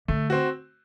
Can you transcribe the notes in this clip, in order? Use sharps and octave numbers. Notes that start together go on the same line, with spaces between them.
D3 A3
C4 F#4